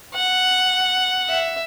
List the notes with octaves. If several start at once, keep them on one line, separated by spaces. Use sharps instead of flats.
F#5
E5